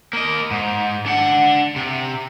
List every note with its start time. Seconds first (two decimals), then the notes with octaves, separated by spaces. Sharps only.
0.13 A#3 D#5
0.51 G#2
1.06 D4 F#5
1.76 C3